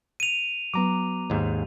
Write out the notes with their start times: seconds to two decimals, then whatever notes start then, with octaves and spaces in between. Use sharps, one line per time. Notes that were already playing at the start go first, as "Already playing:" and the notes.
0.20 D#7 F7
0.74 F#3 B3 A#5 D6
1.30 D#2 G#2